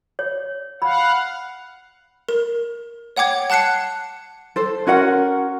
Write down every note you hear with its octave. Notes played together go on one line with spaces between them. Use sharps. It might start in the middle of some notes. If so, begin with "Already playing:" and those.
C#5
F5 F#5 B5
A#4
C#5 F#5 G5 D6 G#6
F#5 A5 F#6 C7 C#7
A4 C5
C#4 F#4 A#4 F#5